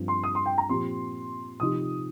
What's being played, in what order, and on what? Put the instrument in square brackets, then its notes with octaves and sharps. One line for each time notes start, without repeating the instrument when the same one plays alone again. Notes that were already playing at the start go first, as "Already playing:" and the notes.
Already playing: [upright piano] G2 F3 C4
[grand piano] C6
D#6
C6
G5
A#5
[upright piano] A#2 F3 C4 G4 [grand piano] C6
[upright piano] C3 F3 D#4 G4 [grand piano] D#6